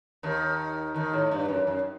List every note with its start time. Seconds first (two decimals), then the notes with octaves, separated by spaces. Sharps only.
0.23 D#2 D#3
0.94 D#2 D#3
1.13 A2
1.31 G2
1.48 F#2
1.67 F#2